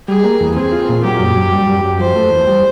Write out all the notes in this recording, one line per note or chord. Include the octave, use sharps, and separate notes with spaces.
G3 G#4
A#3
E2
C4 G#4
F4
A#2
F#3 G4
F#2
F#2
G3
F#2
F#2
F3 C5
A3
E2
G3